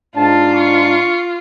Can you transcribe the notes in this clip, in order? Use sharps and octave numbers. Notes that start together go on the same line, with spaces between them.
G#2 D4 F4 A5
C#6